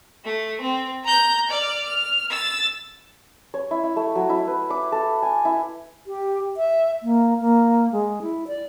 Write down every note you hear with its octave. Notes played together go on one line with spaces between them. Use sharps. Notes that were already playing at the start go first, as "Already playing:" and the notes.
A3
C4
A#5 G6
D5 F6
F6
E6 A6
C#5
E4
E4
A3
F#3
E4
B4
D6
A4
G#5
E4
G4
E5
A#3
A#3
G#3
E4
D5